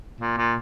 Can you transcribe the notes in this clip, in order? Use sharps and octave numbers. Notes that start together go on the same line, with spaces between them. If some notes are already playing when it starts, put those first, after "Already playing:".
A#2
A#2